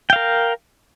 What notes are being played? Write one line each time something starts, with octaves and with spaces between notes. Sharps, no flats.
A#4 F5 G5